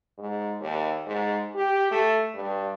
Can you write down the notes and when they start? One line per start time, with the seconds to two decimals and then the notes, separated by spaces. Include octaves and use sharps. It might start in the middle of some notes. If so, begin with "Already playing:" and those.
0.18 G#2
0.60 D#2
1.06 G#2
1.55 G4
1.91 A3
2.34 G2